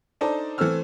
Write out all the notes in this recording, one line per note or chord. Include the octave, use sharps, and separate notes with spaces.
D4 D#4 A4 C5 D5
E3 A3 C4 C5 E6 F6